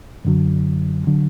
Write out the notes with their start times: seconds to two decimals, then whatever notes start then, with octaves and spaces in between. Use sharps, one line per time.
0.25 F#2 D3 F#3
1.07 D3 F#3